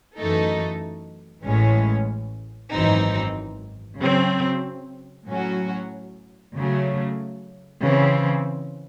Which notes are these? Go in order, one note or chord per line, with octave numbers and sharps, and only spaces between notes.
F#2 E3 A3 D#4 A4
A1 A2 E3 G#3 C#4
G#1 F#2 E3 C4 D#4
C#3 F#3 C4
A2 F#3 C#4 F#4
C#3 F#3 A3
C#3 E3 C4